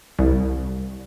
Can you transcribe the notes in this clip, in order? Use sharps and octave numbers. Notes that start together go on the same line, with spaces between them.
C2